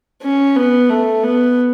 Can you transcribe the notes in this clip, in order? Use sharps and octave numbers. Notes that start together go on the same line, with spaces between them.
C#4
B3
A3
B3